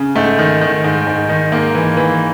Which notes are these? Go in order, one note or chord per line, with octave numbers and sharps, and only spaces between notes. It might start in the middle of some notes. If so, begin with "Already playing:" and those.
Already playing: C#3
G#2 A3
D#3
D#3
G#2
G#2
D#3
G#2 A#3
E3
E3